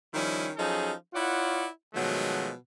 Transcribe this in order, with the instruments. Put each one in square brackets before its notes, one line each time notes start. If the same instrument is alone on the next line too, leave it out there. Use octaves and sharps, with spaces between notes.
[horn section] D#3 F3 G3 C#4 D#4 E4
F3 F#3 C#4 D#4 G#4 A4
E4 F4 C#5 D5 F#5
B2 D#3 F3 F#3 G#3 A3